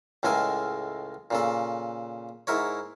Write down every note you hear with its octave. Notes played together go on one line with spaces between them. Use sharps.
C#2 A2 G#3 A4 A#4 G#5
A#2 C#3 A4
G#2 E4 A#4 C#5